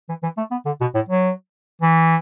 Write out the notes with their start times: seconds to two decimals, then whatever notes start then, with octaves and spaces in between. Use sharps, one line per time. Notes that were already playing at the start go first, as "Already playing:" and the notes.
0.09 E3
0.23 E3
0.38 A3
0.51 B3
0.66 D3
0.81 B2
0.95 A2
1.09 F#3
1.82 E3